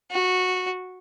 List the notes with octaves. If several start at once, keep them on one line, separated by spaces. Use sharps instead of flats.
F#4